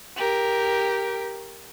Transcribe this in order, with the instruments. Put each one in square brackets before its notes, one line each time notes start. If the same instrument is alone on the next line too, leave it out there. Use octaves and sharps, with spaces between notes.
[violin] G4 A#4